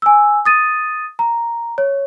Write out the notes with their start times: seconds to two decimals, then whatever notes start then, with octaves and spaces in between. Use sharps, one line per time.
0.02 G#5 E6
0.45 D#6 A6 D#7
1.19 A#5
1.78 C#5